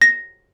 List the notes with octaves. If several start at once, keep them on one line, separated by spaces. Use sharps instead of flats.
A#6